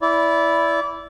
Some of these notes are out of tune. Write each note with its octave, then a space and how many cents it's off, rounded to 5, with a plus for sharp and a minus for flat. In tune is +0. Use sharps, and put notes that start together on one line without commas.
E4 +0 D5 -25